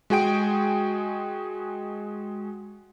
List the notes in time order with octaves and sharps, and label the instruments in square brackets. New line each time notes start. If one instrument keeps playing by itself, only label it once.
[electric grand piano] G#3 F#4 G#4 G5 D7